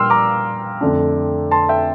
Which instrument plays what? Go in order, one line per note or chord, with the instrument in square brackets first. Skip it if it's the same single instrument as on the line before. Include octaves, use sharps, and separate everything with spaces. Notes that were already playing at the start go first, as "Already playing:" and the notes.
Already playing: [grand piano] A#2 G3 A#3 D4 G5 C6 E6 F6
A#5 D6
F2 D3 A3 D4
A5 C6
E5 G5